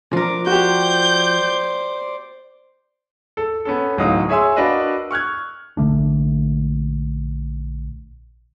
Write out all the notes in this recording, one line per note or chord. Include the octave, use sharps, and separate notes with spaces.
F3 D4 A#4 D6
F#4 G4 C5 D5 G6
A4
B3 C#4 A4
D1 A1 F#3 D#4 F5 D#6
G#4 C#5 E5 G#5 C6 E6
D4 F#4 A#4 B4 D#5 F5
C#6 F6 F#6 G#6
A#1 D3 A3 D4